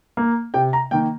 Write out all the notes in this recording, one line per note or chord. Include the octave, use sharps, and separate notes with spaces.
A#3
C3 G5
A#5
D#3 A#3 G5